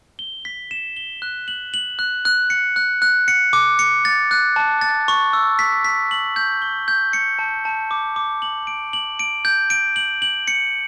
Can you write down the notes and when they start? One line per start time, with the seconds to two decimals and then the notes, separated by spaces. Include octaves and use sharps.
0.19 G7
0.45 B6
0.71 E7
0.97 G7
1.22 F#6
1.48 F#7
1.74 F#7
1.99 F#6
2.25 F#6
2.50 C#7
2.76 F#6
3.02 F#6
3.28 C#7
3.53 D6
3.79 C#7
4.05 A6
4.31 F#6
4.56 A5
4.81 A6
5.08 C#6
5.33 E6
5.59 B6
5.85 B6
6.11 F#7
6.36 G6
6.62 G7
6.88 G6
7.13 C#7
7.39 A5
7.65 A5
7.91 D6
8.16 D6
8.42 F#7
8.67 D7
8.93 F#7
9.19 D7
9.45 G6
9.70 D7
9.96 F#7
10.22 F#7
10.48 C#7